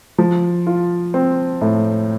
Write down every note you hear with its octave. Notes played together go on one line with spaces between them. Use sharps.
F3
F4
C4
A2